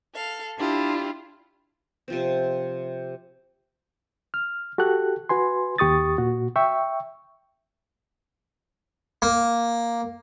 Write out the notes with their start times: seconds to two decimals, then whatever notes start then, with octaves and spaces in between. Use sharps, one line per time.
0.15 A4 F5
0.58 D4 E4 F4 G4
2.08 C3 F3 C4
4.34 F6
4.78 F#4 G4 A4 F#6
5.29 F#4 B4 G#5 C6
5.78 D#2 G4 C#6 D#6 A6
6.18 A#2 F#4
6.56 E5 G5 C#6
9.22 A#3